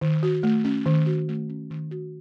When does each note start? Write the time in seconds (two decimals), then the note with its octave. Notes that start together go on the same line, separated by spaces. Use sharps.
0.01 D#3
0.23 F#4
0.43 A3
0.64 C#4
0.86 D#3
1.06 F#4
1.29 A3
1.49 C#4
1.70 D#3
1.91 F#4